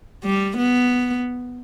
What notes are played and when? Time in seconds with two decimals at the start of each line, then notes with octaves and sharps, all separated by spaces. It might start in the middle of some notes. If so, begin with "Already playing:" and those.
0.24 G3
0.57 B3